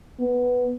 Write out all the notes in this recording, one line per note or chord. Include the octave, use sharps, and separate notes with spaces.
B3